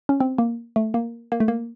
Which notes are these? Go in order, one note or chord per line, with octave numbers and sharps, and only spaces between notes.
C#4
C4
A#3
A3
A#3
A#3
A3
A#3